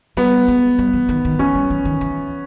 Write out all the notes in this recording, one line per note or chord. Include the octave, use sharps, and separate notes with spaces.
G3 B3
G#3
G3
E3
D#3
D#3
E3 C#4
G3
E3
D#3
E3